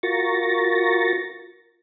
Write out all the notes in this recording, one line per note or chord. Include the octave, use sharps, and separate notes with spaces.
F4 F#4 A#4 C#6 A6 A#6